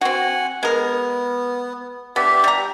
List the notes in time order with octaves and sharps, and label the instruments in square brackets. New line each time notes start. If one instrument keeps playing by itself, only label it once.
[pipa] C4 F#4 [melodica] F#5 G#5
[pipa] G#3 A#4 [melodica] B3
[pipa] B3 [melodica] D4 G4 E5
[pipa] G3 A#5